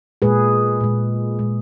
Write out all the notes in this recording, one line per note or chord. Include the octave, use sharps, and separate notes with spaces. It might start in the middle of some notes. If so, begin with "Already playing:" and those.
A#2 G#3 G#4 B4
A#2 G#3
A#2 G#3